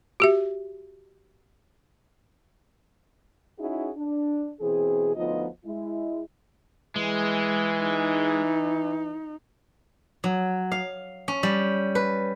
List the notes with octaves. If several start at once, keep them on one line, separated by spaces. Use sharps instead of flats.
F#4 G4 E5
C#4 D#4 E4 F#4 G#4
D4
B2 E3 C4 G#4
D2 F3 B3 D#4 F4 D#5
G#3 E4
E3 G#3
D#4
F#3
F5
C#4
G3
B4